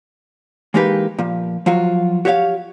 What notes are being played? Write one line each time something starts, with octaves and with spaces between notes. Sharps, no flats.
E3 G#3 A#3 D#4 G4 B4
A#2 F3
F3 F#3 F4 F#4
F#4 G4 C#5 E5 F5